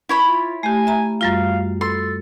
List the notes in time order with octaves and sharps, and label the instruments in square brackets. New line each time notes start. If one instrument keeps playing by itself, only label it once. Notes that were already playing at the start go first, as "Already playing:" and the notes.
[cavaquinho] E4 C#5 B5
[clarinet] F4
[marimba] A3 G4 [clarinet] G#5
[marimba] E5 A#5
[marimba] F#2 G3 F4 [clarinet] F5
[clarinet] A4 [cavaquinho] C6